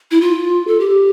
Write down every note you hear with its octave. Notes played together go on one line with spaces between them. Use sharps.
E4
F4
A4
G4